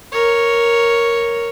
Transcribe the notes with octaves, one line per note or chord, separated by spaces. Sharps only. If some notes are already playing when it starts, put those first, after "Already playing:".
A#4 C#5